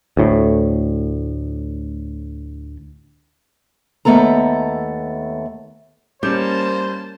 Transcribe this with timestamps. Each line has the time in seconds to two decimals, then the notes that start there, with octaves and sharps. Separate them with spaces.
0.17 D2 A2
4.05 D#2 A#2 A3 B3 A4 A#5
6.23 G3 A#3 C#4 C5 A5 D6 G6